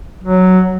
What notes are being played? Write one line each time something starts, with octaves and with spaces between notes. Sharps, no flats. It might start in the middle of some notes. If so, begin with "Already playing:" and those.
F#3